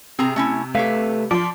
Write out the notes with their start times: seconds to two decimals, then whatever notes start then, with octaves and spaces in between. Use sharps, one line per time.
0.19 C3 C4 G#4 A#5
0.36 A3 C#4 E4
0.75 A3 G4 B4 C#5 F5
1.31 F3 D5 C6